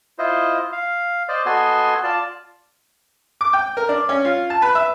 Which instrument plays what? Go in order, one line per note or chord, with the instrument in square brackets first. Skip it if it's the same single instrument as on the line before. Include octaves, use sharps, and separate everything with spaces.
[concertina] E4 F4 C5 D#5
F5
C5 D5 D#5
B3 F#4 A4 D#5 G#5 C6
F4 D5 A5
[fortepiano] D6
G5
A#4
D4
C#4
F4
A5
B4
E5